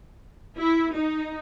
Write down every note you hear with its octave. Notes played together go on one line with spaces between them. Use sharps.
E4
D#4